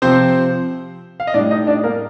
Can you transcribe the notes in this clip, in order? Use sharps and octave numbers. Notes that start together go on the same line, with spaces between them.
C3 F3 C4 C5
F5
D#5
A2 G3 D4 D5
D#4 D#5
D4 D5
A#3 A#4